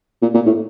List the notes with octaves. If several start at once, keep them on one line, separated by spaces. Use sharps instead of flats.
A#2
A#2
A2